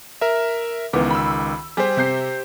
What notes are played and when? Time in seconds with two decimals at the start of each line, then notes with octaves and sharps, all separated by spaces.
0.21 A#4 E5
0.93 C#2 D#3 E3 B3 D6
1.11 B5 E6
1.77 G3 G4 G#4 C5
1.97 C3 G6 C7